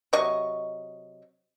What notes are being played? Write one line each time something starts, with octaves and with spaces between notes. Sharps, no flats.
C3 F#3 D#5 C#6